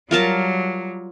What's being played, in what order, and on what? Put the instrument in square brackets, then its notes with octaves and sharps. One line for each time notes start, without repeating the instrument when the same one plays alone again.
[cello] F#3 G3 [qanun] F4 A#4 A5